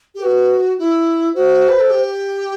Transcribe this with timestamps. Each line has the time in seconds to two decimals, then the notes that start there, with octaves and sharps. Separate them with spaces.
0.15 G4 A4
0.22 F#4 B4
0.79 E4
1.35 F#4 C5
1.69 B4
1.80 A4
1.90 G4